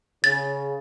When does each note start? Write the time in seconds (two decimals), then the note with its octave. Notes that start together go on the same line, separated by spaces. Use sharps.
0.24 C#3 A6